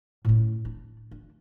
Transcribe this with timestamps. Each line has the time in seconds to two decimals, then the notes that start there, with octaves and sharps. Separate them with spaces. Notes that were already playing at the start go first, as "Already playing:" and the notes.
0.25 A2 C#4
0.65 D4
1.11 D4